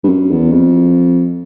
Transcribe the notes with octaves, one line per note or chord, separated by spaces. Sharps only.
G2
F#2
E2
F2